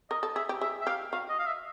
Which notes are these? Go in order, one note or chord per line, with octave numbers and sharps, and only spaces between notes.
A#4 D#5
A4
G#4 E5
G4
G#4 E5
E5
G4 F5
F#4 F5
D#5
F5
E5